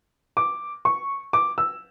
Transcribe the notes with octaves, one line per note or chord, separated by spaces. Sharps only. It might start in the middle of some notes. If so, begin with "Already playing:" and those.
D6
C#6
D6
E6